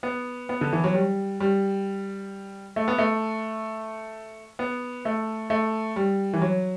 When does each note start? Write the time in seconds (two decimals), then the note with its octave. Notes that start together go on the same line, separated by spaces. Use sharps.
0.03 B3
0.49 B3
0.61 D3
0.73 E3
0.84 F#3
0.94 G3
1.40 G3
2.76 A3
2.88 B3
2.98 A3
4.59 B3
5.05 A3
5.50 A3
5.96 G3
6.33 E3
6.41 F#3